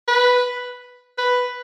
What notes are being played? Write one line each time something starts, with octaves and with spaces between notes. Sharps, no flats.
B4
B4